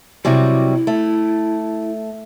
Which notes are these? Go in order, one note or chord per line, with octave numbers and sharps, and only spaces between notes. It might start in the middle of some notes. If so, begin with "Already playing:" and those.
C3 F#3 G3 E4
A3